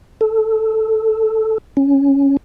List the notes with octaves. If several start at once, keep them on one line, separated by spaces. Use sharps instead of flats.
A4
C#4